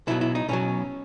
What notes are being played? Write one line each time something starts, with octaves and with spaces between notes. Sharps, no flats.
B1 B2 F#3 E4
E4
D#4
B1 B2 F#3 C#4